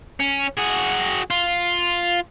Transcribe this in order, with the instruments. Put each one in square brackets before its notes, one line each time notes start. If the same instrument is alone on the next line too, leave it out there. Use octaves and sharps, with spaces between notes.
[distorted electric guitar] C#4
F#4 G#4
F4